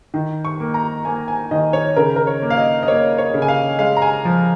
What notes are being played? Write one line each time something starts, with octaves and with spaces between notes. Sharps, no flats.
D#3
C#6
A#3
A#5
A#3 G#5
G#5
D#3 D#5
C#5
C#3 A#4
A#4
C#5
A#3
F5
D#5
D#5
A#3 C#5
C#5
C#3
G#5
F5
G#3 F5
A#5
G#5
F3